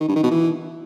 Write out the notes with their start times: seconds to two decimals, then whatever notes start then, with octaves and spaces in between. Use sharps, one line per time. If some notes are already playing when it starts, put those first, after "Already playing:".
0.01 D#3
0.08 G2
0.16 D#3
0.23 B2
0.31 E3